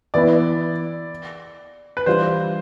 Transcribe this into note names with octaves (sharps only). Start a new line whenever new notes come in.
E3 B3 E4 D5
B4
E3 G3 D4 F4 C5